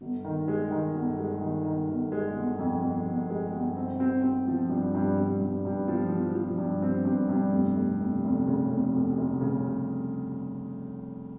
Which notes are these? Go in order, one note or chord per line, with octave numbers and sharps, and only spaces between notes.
G1
D#3
G#3
D#3
G1
G#3
D#3
D#3
G1
G#3
G1
F2
F2
G1
G#3
G1
C4
C4
C4
F3
G2
G2
G2
G2
G2
F3
F3
F3
G2
C4
G2
G2
F1
F1
F1
F1
C#3
F1
F1
F1
C#3